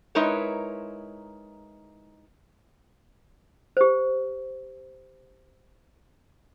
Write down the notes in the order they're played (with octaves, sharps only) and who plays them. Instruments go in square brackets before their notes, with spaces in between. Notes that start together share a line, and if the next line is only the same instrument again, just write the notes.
[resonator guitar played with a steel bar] G#3 D#4 E4 A#4 B4 C#5
[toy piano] G4 C5